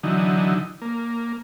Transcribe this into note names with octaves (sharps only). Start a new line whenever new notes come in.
D3 E3 F#3 D#4
A#3